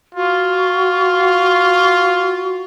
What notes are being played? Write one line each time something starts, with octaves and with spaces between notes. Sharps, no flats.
F4 F#4